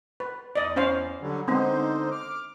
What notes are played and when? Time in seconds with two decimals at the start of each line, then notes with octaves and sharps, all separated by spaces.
0.20 B4
0.56 E2 D5 D#5
0.76 C#4 C5 F5
1.21 D3 F#3 G3
1.48 D3 G#3 B3 C4 D#4 C5
2.11 D6 F6